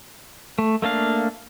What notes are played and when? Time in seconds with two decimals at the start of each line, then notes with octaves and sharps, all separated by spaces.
0.59 A3
0.82 A3 A#3 D4 F5